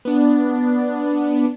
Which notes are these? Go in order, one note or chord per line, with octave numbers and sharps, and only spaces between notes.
B3 D4